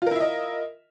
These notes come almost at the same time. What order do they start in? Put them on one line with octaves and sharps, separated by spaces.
F4 A#4 E4 E5 D#5